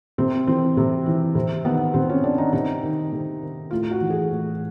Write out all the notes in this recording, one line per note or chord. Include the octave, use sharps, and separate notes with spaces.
C3 C4
E3 C4
C3
E3
C3
D#3 B3
C3 C4
C#4
D#3 D4
D#4
C3 D#4
D#3
C3
D#3
A2 F4
F#4
E3
G#4
A2